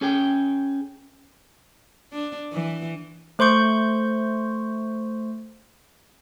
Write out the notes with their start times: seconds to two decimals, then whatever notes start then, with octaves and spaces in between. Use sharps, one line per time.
0.01 C#4 G#4 G5
2.12 D4
2.53 E3
3.39 A3 C5 C6 C#6 G6